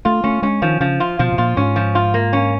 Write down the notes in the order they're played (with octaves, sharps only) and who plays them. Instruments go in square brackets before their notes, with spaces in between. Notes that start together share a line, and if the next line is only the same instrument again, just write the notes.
[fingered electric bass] A3 [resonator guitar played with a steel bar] F4
[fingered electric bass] A3 [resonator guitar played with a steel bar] C#4
[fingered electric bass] G#3 [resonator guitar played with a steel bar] C#4
[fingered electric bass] D#3 [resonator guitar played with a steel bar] F3
[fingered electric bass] C#3 [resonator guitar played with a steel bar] F3
[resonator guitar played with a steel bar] F4
[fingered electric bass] B2 [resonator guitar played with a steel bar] F3
[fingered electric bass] B2
[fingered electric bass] A#2 [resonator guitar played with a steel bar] F4
[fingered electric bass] G#2 [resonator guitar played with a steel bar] C#4
[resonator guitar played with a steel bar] F3
F4
A#3
C#4